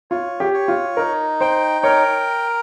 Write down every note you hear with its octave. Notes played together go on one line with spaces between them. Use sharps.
F4 C#5
G4
C#5
F4
D#4 A#4
C5 G5
A#4 C#5